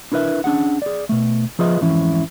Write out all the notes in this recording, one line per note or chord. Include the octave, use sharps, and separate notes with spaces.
D4 E4 A#4 B4 E5
C#4 D4 G#4 F#5
G#4 D5
B2 A3
F3 F4 G#4 B4 D#5 E5
F2 G#2 E3 C#4 E4